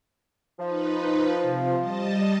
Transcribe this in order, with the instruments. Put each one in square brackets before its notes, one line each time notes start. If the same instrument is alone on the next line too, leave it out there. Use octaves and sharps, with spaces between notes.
[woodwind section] F3 [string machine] D#4 B4
[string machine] C3
G3 D#5 A5